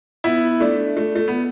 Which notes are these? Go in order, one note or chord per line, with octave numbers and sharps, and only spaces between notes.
B3 E4
A3 D4
A3
A3
B3